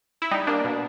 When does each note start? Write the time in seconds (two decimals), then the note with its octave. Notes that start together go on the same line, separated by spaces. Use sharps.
0.22 E4
0.31 G3 D#4
0.47 A#3 D4
0.64 B2